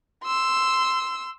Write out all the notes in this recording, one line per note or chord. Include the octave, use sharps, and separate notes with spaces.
C6 E6